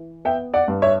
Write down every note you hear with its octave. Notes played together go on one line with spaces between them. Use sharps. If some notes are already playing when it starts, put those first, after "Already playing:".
Already playing: E3
B3 E5 G5
D5 F#5
G2
C#5 E5